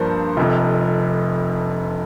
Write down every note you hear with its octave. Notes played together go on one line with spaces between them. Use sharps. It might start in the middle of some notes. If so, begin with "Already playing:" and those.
Already playing: G2 F3 A#3 C5
F1 F2 C3